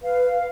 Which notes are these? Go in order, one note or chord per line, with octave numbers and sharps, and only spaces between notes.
B4 F5